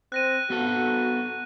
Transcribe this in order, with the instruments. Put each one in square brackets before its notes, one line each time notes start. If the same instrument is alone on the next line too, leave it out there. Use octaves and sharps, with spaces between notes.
[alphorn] C4 [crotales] F#6 A#6 D#7
[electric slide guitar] B3 A4 [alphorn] F#4